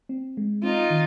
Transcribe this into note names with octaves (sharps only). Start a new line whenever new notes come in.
C4
G#3
C4 D#4 F4
D#3